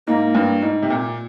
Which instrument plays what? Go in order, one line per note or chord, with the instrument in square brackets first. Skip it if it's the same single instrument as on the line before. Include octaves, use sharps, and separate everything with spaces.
[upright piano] G#2 [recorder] A#3
[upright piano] G2
G#2
C3
A#2